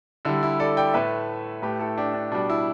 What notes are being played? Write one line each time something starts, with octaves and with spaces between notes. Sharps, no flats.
D3 G3 E4
E4
A4 D5
D5 G5
A2 A3 B4 E5
A2 A3 G4 B4
E4 A4
D4 G4
D4
B2 G3 D4
E4